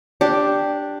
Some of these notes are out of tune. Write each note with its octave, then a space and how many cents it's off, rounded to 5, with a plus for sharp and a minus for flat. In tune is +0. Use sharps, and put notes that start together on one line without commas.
D4 +0 G4 +0